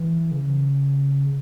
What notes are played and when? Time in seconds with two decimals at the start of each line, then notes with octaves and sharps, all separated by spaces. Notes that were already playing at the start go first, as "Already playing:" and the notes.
Already playing: E3
0.32 C#3